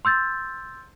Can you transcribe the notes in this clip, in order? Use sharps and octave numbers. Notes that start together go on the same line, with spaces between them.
C6 E6 G6 A6